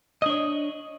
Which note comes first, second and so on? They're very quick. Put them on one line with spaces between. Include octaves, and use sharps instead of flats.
D#5 D4 C#5